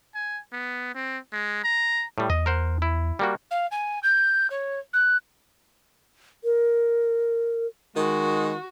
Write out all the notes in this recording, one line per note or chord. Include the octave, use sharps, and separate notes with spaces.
G#5
B3
C4
G#3
A#5
A2 G3
E2 D#5
A#4 C5 F#5
E4
G3 A#3 F#4
F5
G#5
G6
C#5
F#6
A#4
D#3 G#3 F#4